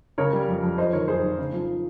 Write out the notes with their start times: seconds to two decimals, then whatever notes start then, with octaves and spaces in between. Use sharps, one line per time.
0.18 C#3 A#4 C#5
0.33 G3
0.48 F2
0.63 F2
0.78 F2 C5 D#5
0.93 D#3 A#4 C#5
1.08 F1 G#4 C5
1.23 F1
1.39 C#3
1.53 F3